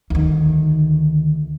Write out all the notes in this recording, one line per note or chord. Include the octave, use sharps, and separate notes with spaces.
D2 D#3